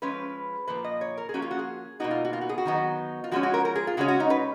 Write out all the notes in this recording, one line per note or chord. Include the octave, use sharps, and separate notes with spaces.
F3 G#3 C#4 B4
A#2 F3 A#3 B4
D#5
C#5
A#4
G#4
F3 A#3 C#4 F#4
F4
F#4
G#4
B2 A#3 D#4 F#4
F4
F#4
F4
F#4
G#4
F#4
D#3 F#3 B3 D#4
F4
F3 G#3 C#4 F#4
F#4
A#4
A#4
G#4
F4
C#3 G#3 C#4 F#4
F#4
D#4
B4